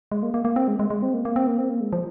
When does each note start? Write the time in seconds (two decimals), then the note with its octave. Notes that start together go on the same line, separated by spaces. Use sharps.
0.12 G#3
0.23 A#3
0.34 A#3
0.45 A#3
0.56 C4
0.68 G#3
0.79 G#3
0.90 G#3
1.02 C4
1.13 A#3
1.25 A#3
1.36 C4
1.47 A#3
1.58 C4
1.69 A#3
1.81 G#3
1.93 F3